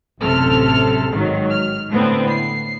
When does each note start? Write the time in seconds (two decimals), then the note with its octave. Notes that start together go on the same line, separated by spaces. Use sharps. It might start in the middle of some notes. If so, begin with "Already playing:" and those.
0.20 A1 F#2 C3 A4 F6
1.11 G#2 D#3 F#3
1.50 F6
1.90 A2 D3 B3 C4
2.30 C7